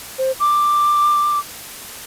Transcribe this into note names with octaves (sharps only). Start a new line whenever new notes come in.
C5
D6